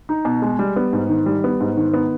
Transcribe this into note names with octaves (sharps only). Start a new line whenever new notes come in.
D#4
B2
G#3
G3
B3
G#2
D#3
G3
B3
G#2
D#3
B3